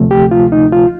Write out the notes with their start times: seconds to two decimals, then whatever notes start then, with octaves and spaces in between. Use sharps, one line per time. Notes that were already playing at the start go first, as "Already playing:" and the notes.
Already playing: D2 C3 F3 A3
0.11 G4
0.31 F4
0.52 D#4
0.72 F4